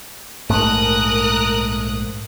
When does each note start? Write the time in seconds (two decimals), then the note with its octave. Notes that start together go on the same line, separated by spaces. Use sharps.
0.50 A#1 G#2 A3 A#4 D#6 F#6